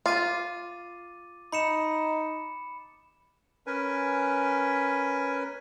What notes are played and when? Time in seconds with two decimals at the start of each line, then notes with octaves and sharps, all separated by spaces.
0.06 F4 D6 A6 D#7
1.52 D#4 B5 C#7 E7
3.67 C#4 A#4 B4 G#5